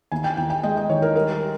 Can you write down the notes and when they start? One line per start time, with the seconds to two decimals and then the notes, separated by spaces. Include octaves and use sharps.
0.12 D#2 G#5
0.24 G5
0.37 D#2 G5
0.50 G5
0.63 G#3 D#5
0.77 D#5
0.89 D#3 C#5
1.02 A#4
1.15 G3 A#4